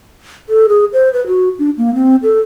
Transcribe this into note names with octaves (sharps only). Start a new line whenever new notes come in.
A4
G#4
C5
B4
F#4
D4
A#3
C4
A4